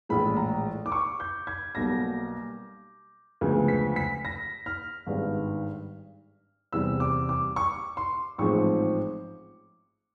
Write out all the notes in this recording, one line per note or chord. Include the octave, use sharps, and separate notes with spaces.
A#1 A2 E3 G#3 B5
A#5
D6
C#6
G6
G#6
B1 B2 G3 A#3 A#6
D2 C#3 F3 G#3 B3
B6
B6
A#6
F6
G#1 G2 D#3 G#3 B3
E2 C3 E3 G3 E6
D6
D6
C#6
C6
A1 G#2 F3 G#3 C4 C#6